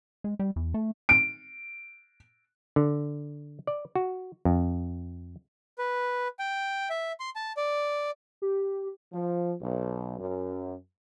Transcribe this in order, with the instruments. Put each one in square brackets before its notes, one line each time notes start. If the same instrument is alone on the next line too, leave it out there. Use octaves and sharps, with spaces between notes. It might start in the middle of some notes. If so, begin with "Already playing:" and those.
[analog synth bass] G#3
G3
E2
A3
[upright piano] D7
[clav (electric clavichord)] D3
D5
F#4
F2
[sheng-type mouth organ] B4
G5
E5
C6
A5
D5
[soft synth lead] G4
[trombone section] F3
B1
F#2